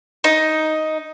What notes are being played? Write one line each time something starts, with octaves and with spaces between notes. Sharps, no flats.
D#4